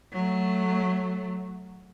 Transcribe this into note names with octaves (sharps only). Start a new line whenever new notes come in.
F#3 A3